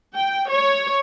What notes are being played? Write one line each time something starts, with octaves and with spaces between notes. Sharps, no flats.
G5
C#5